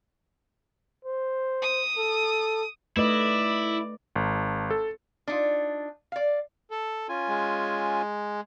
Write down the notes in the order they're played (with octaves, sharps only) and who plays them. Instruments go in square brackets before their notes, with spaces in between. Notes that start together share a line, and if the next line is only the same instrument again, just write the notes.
[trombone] C5
[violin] D#6
[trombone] A4
[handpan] A3 B4 D#5 [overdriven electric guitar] E4 [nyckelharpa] D5
[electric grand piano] G#1
A4
[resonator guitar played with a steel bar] D4 D#4 F4
D5 F5
[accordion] A4
[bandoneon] C#4 F4 G#5
[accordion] G#3